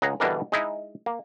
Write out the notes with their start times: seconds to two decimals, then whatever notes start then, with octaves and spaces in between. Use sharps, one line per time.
0.02 C#2 G#4 F#5 A#5
0.20 B2 D3 E3 G3 D4 A#4
0.52 G#3 D#4 E4
1.06 A#3